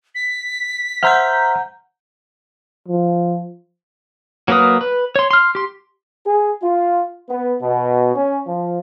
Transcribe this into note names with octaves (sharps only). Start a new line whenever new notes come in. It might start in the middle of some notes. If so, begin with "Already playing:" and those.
B6
C5 E5 F#5 A#5 F6 G6
F3
F#3 A#3 A#4 B4 D#6
B4
C#5 C6
C6 F6
G4 C6
G#4
F4
B3
B2
C#4
F3